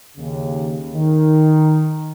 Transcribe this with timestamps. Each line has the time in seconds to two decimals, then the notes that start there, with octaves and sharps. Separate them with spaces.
0.17 D#2 C#3
0.93 D#3